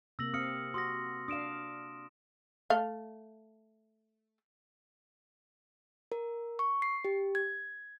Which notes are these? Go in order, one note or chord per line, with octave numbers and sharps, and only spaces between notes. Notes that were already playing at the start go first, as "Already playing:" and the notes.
C3 A#3 E6 A#6 F#7
C4 F5 D#6 F6 C#7
F#4 C6 D#6 A#6
D4 F5 D#6 D7 E7
A3 F5
A#4
C#6
C7
G4
G#6